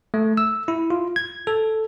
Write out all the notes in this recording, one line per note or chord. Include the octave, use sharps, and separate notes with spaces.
A3
E6
E4
F4
G#6
A4